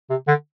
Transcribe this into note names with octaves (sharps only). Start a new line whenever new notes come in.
C3
D3